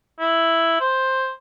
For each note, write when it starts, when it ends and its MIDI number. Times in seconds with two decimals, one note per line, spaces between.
0.20 0.79 64
0.80 1.32 72